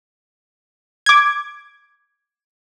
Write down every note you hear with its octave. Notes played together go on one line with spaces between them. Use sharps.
D6 G#6